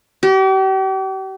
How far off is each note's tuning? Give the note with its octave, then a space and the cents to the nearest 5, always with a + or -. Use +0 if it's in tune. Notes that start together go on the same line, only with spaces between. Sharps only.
G4 -40